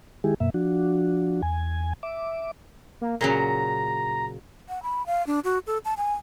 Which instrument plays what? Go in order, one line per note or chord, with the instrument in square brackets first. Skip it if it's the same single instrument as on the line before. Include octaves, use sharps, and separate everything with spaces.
[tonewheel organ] D#3 G#3 E4 G4 G#4
F#2 B2 A#3 E5
F3 D4 F#4
E2 G#5
E5 D6
[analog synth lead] A#3
[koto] A#2 C#3 F#3 [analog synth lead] A#5
[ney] F#5
B5
F5
D4
F#4
A4
A5
G#5